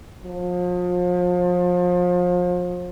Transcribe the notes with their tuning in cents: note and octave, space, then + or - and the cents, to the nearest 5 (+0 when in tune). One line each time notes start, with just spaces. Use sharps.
F3 +35